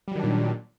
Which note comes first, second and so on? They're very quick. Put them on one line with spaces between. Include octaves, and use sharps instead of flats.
G3 F#3 D#3 D4 A#2